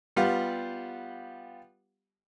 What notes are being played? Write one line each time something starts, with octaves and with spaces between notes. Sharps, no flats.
G3 B3 F4 G4 F5 F#5